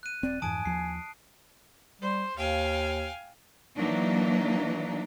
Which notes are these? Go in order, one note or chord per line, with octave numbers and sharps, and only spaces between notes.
F#6 D#7
D#1 C4 D5
F2 G#2 E3 G#5 A5 D#6 D7
D#2 F3 C7
G3 C5
D#2 F5 G5 G#5
E3 F#3 A#3 D4 D#4